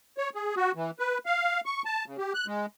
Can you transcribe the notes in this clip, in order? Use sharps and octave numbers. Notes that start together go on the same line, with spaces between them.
C#5
G#4
F#4
E3
B4
F5
C#6
A5
C#3
G4
F#6
G#3